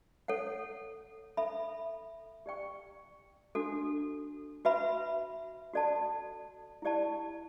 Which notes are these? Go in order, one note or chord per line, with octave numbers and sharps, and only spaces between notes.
A4 C#5 F#5
A4 E5 B5
G4 D5 G5 C#6
D4 F#4 A4
F#4 B4 E5 B5
F#4 A4 D5 A5
E4 G4 D5 A5